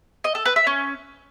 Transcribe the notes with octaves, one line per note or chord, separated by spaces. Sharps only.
D#5
A4
B4
E5
C#4